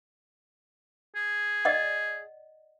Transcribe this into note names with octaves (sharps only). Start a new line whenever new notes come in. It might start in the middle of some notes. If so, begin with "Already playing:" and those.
G#4
D5 D#5 F#5